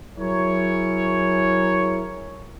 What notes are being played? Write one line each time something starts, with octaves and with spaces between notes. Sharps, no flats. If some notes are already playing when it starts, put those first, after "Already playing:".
F#3 E4 G#4 A#4 C#5